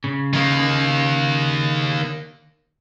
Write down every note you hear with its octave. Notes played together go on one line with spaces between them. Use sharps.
C#3
D#3 A#3